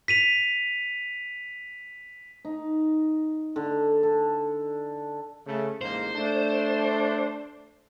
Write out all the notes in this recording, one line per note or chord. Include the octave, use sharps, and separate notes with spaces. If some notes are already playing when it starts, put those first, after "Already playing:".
B6 D#7 F7
D#4
D3
A4
C#3 A3
A1 G#2 A#3 C5
A3 D4